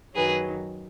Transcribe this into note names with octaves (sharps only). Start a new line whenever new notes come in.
F#2 D#3 F#3 G#4 B4